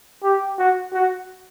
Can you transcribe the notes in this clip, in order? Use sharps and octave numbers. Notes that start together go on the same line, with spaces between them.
G4
F#4
F#4